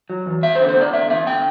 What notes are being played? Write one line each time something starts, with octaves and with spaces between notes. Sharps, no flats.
F#3
E2
B3 E5
C5
D3
C5
B3 D5
D3 E5
B3 E5
D3 G5